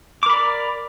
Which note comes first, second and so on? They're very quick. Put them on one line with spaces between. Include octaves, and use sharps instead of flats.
D6 A#4 B5 D5